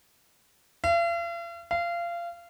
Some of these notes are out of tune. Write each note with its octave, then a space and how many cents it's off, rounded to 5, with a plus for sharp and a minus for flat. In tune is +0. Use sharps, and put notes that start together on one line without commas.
F5 -45
F5 -25